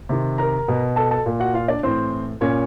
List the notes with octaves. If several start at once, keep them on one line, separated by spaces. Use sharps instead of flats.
C3 D#3
A#4 A#5
B2
A4 A5
A4 A5
A#2
F#4 F#5
F4 F5
D4 D5
A2 E3 C4 C5
A#2 C#4 C#5